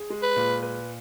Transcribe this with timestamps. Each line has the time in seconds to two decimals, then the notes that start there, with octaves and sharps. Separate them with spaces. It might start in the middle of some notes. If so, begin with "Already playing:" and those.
Already playing: G#4
0.10 G#3
0.23 B4
0.36 A#2
0.62 B4